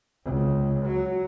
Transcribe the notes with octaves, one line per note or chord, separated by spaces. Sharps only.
C#2
F#3